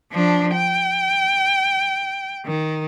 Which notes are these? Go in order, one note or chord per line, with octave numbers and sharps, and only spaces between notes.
F3 D4
G5
D#3